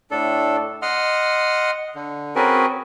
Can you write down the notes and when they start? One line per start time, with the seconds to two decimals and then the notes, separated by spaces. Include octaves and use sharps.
0.11 A2 D4 A4
0.82 D#5 F#5 C6 F6
1.95 D3
2.36 C4 C#4 F#4 G#4 A#4 B4